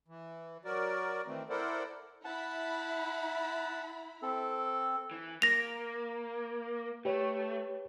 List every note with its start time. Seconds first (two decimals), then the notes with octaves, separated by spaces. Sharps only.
0.08 E3
0.65 F#3 F#4 A#4 D5
1.27 D#3 E3 A3 C4
1.50 E4 A4 A#4 C5 D5 F#5
2.24 E4 F#5 A5 B5
4.23 C4 A4
5.11 E3
5.42 A#3 A#6 F7
7.05 A3 G4 B4 C#5